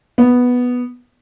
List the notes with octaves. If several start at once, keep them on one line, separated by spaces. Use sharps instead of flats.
B3